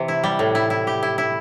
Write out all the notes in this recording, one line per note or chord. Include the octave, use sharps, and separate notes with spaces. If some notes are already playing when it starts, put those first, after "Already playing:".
Already playing: C3 E3
E4
G3
A2
E4
E4
G4
E4
E4